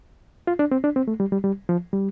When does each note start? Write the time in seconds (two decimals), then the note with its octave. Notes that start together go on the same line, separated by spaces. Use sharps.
0.47 F4
0.59 D4
0.71 C4
0.84 D4
0.96 C4
1.08 A3
1.20 G3
1.32 G3
1.44 G3
1.69 F3
1.93 G3